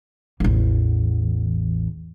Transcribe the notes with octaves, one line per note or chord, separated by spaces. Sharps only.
A1 E2